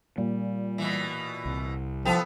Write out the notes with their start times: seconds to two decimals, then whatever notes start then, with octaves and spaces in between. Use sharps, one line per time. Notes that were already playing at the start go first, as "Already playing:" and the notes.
0.18 A#2 G3
0.78 B2 E3
1.45 C2
2.05 F3 B3 A4 G5